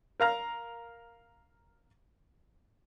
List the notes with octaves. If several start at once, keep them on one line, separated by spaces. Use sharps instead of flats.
A#4 F5 A#5 F6